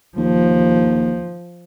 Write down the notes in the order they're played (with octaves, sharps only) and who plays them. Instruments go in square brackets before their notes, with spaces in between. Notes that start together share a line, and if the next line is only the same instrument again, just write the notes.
[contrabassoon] D#2 [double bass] F3